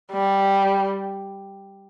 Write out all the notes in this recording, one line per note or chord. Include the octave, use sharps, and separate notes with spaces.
G3